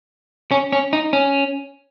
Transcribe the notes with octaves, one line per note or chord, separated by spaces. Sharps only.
C#4
C#4
D#4
C#4